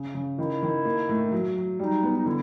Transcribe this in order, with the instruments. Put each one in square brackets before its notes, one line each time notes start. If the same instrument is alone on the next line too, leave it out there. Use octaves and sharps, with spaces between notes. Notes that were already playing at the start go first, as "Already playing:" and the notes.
Already playing: [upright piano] C#3
C#3
[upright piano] D#3 [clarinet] E4
[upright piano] D#3
A#3
A2
F#3
F#3
[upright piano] G3 [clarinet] D#4
[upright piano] B3
[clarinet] D#4
[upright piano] D3 [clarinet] E4